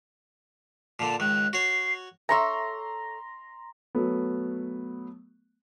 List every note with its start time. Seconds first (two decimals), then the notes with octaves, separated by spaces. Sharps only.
0.99 A#2 D3 A5
1.20 C#2 D#3 F#6
1.53 F#4 C#5 C7
2.29 A4 C#5 E5 A#5 C6
3.95 F#3 A3 B3